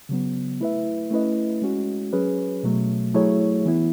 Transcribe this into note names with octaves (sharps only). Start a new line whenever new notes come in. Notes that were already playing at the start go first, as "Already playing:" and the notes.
C#3 F#3 B3
A3 E4 B4 E5
A3 C#4 E4 B4 D#5
G#3 C#4 F#4
F#3 C#4 G#4 B4
B2 F#3 A3
F#3 A3 E4 G#4 C#5
E3 B3 E4